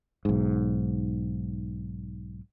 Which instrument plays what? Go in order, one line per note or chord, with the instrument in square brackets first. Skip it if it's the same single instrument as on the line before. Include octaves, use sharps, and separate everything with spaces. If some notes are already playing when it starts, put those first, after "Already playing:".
[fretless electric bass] B1 G#2